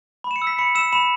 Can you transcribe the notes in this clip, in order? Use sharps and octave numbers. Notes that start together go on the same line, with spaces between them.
B5
E7
C#7
E6
B6
B5 C#7
E6 E7
B5 E7